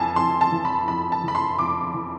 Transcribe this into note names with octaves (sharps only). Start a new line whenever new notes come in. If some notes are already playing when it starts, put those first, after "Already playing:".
Already playing: F2 E3 G#5 A5
F2 C6
A5
E3
B5
F2 B5
A5
E3 B5
C6
F2 D6
E3